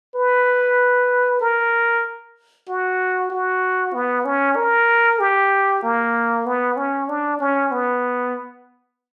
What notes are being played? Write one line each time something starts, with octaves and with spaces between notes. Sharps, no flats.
B4
A#4
F#4
F#4
B3
C#4
A#4
G4
A#3
B3
C#4
D4
C#4
B3